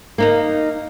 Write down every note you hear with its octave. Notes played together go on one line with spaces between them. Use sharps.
A#3 D#4 F5